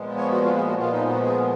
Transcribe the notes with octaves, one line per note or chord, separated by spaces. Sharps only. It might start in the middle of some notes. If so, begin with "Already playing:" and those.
Already playing: A#2 F3 G#3 B3
C#5
F#4
F4
G#4
F#4
A#2 F3 G#3 B3 F4
D#4
F#4
G#4